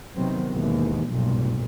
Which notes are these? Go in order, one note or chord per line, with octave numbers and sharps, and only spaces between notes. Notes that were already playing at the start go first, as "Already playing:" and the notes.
C3 D#3 F#3 B3 C4
D#2 G#2 B2 E3
F1 B1 G2 A#2